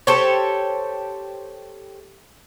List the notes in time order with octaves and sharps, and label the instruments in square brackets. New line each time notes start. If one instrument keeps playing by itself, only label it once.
[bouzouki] G4 A4 C5 C#5